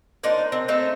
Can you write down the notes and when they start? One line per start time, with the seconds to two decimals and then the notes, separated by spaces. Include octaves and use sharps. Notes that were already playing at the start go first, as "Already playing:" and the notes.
0.23 A#3 D4 D#4 C5
0.52 C4
0.68 A3 C4 D#4